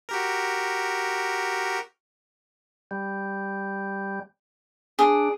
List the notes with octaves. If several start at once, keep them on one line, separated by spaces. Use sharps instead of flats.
F#4 G4 A#4
G3
D4 G#4